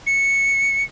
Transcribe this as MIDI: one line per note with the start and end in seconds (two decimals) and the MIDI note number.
0.07 0.83 97